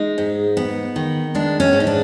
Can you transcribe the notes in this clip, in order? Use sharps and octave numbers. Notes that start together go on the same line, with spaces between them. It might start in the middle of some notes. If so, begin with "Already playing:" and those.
Already playing: G#3 D#4
G#2
B3
D#3
G#3 D4
C#4
G#2
D#4
D4